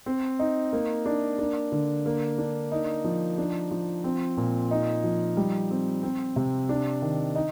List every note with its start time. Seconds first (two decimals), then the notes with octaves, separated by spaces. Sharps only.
0.06 C4
0.39 D#4
0.73 A#3
1.06 D4
1.39 D4
1.72 D3
2.06 A#3
2.38 D4
2.72 D#4
3.04 F3
3.38 D4
3.71 F3
4.04 C4
4.37 A#2
4.71 D#4
5.04 F3
5.37 G3
5.70 C4
6.03 C4
6.36 C3
6.69 D4
7.02 D#3
7.35 D#4